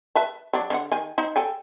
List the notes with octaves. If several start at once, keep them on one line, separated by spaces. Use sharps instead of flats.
B4 E5 A5
F#3 D4
D3 C#4 F#5
D#3 G#5
D#4 C5
A4 G5 G#5